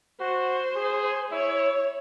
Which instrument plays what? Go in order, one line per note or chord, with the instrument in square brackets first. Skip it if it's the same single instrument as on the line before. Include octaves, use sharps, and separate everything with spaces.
[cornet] F#4 [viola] C5
[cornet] G#4
[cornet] E4 [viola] C#5